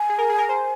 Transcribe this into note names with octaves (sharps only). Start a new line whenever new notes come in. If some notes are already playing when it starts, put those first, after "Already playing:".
Already playing: G#5
G#4
A#4
G#4
A#4
C5